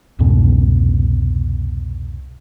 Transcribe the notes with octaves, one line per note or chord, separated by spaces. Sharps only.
C2 F2 G#2 B2